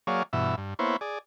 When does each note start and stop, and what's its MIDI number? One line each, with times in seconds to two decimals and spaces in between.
0.07 0.23 54
0.07 0.23 58
0.07 0.23 68
0.07 0.23 73
0.07 0.23 74
0.07 0.23 77
0.33 0.55 43
0.33 0.55 47
0.33 0.55 52
0.33 0.55 76
0.58 0.74 43
0.79 0.96 58
0.79 0.96 59
0.79 0.96 64
0.79 0.96 72
0.79 0.96 73
1.01 1.19 68
1.01 1.19 74